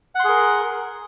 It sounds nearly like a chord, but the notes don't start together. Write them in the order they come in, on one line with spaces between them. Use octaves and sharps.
F#5 C6 G#4 A#4